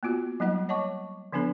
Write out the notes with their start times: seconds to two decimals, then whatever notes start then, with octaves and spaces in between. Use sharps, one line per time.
0.03 A#3 B3 F4 F#4
0.40 F#3 G3 A#3 D#4 D#5 F#5
0.69 C#5 D#5 F#5 A5 C#6 D6
1.32 D3 F3 B3 D4 A4 A#5